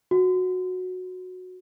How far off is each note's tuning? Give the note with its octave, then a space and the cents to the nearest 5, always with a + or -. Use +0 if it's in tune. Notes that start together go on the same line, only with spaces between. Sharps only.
F#4 -15